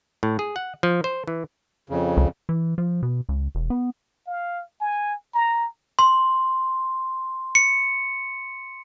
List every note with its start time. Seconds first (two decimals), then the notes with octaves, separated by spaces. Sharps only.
0.23 A2
0.39 G#4
0.56 F#5
0.83 F3
1.04 C5
1.27 E3
1.90 F2 C#3
2.17 C#2
2.49 E3
2.78 F3
3.03 B2
3.29 C#2
3.55 E1
3.70 B3
4.26 F5
4.81 G#5
5.34 A#5
5.99 C6
7.55 C#7